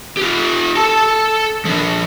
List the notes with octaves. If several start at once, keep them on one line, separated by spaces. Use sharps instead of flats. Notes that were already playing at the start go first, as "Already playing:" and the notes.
F4 G4
A4 A5
F3 D4